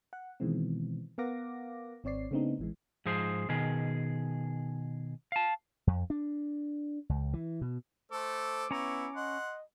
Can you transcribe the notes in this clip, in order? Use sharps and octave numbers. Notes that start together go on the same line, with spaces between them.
F#5
B2 D#3 E3 G#3 C4
B3 A#4 F5 F#5 D6 A#6
G#1 C4 C#5 D5 C7
C#3 A3 B3 C4 D4 D#4
A1 E3 G#3
G#2 F3 G#4 C5
B2 D#3 G#4
F5 A5
F2
D4
C#2
E3
B2
A3 A4 C5 D6
B3 C#4 E4 C#5 A#5
D#5 F#5 C6